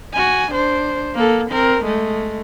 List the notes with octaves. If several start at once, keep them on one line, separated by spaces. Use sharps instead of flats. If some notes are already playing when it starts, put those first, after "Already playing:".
F#4 G#5
D4 C5
A#3 A4
C4 A#4
G#3 A3